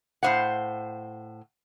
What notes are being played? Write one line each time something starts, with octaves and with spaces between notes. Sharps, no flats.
A2 C4 C5 F5 F#5